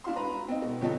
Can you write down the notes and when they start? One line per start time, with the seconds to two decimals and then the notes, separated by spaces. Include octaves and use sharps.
0.04 D4 E4 F#4 F5 C6
0.16 B4 A#5 B5
0.48 C4 D#4
0.62 B2
0.81 G1 F3 C4 C#4 D#4 A4